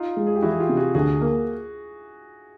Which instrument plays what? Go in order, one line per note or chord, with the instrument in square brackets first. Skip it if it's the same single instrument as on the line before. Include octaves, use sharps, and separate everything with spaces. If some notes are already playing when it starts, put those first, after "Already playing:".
Already playing: [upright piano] D#4 F4
[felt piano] G#3
[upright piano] G#4
G4
[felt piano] E3 [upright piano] E4 F#4
[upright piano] G#4
F4 G4
[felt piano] C3
[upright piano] F#4 G#4
[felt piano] D2 [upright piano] F#4 G#4
[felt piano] A#3